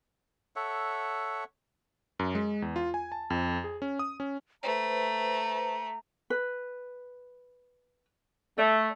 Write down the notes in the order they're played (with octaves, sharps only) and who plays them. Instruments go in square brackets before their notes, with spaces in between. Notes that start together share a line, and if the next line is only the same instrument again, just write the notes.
[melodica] A4 C#5 E5 F#5
[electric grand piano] F#2
G#3
E2
F4
G#5
A5
F2
G#4
C#4
D#6
C#4
[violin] A3 [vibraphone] B4 C5 [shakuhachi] A#5
[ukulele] B4
[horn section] A3 [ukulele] D5 E5